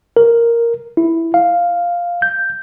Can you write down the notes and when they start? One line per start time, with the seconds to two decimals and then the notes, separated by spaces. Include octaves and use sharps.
0.17 A#4
0.97 E4
1.34 F5
2.22 G6